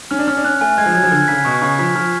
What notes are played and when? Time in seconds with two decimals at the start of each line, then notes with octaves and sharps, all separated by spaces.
0.11 C#4 F6
0.19 D4
0.27 C#4 F6
0.37 D4
0.44 C#4 F#6
0.61 A3 G#5
0.78 G#3 G#6
0.86 F3
0.95 F#3 G#6
1.03 F3
1.11 D3 F6
1.28 C#3 B6
1.45 B2 C#6
1.62 C#3 C#6
1.79 F3 B6
1.95 F3 F6